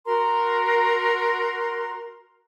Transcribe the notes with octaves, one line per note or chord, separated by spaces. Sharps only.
F#4 A#4 A#5 C6